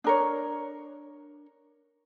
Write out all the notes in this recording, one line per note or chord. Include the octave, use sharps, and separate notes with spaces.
D4 A#4 C#5